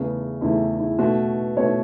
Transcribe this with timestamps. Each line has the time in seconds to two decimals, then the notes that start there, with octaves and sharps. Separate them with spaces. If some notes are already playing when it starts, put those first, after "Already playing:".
Already playing: E2 C#3 A3 B3
0.41 E2 C#3 A3 E4
0.79 E4
0.99 B2 A3 F#4
1.57 B2 A3 C#5